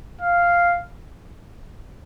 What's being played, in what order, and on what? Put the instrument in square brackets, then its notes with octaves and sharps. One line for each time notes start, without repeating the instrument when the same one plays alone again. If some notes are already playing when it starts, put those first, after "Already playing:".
[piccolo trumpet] F5